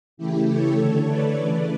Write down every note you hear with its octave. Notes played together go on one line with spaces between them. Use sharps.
C#3 E3 A3 E4 G4
A4 C#5
D3 A3
B4 D5
C#3 E3 A3